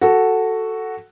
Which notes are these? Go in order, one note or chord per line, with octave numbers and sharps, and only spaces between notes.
F#4 A4